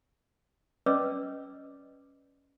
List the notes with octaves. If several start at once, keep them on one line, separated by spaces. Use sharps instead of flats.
C#4 B4 D5 D#5 D6 E6